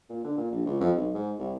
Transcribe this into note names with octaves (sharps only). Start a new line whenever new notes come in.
A#2
D3
A#2
A#1
C#2
F2
B1
G#2
C2